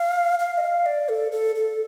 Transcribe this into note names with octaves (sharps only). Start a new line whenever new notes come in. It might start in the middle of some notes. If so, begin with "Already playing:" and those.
Already playing: F5
F5
D#5
F5
D5
A4
A4
A4